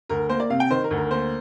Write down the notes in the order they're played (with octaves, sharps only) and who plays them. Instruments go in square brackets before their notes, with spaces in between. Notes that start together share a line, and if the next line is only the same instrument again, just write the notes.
[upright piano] D2 A#4
A#3 C5
D5
C3 F5
G5
D#3 C5
A#4
D2
A#4
A#3 C5